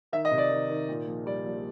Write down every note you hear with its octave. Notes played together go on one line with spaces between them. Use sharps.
D#3 E5
D#5
C3
D5
D#3
D#3
A#2
A#1
G3 D5
A#1